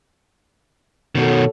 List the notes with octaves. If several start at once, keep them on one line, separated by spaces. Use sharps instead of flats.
B2 D#3 F#4 A4 C#5